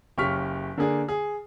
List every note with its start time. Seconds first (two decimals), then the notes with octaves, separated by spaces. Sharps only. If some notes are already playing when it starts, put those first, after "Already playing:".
0.18 F#1 C#3 G4 C#6 F6 B6
0.77 D3 A#3 D4 G#4
1.08 G#4